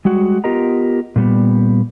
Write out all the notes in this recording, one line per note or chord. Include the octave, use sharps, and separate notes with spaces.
G3 G#3 F#4 F#5
B3 F4 G4 A#4 D#5 A#5
A#2 G3 B3